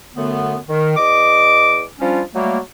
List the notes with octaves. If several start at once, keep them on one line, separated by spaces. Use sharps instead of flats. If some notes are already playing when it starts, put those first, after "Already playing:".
F#2 D3 A3 B3
D#3
E2 D#5 D6
F3 G3 C#4 D4 F4
F#3 G3 A3 A#3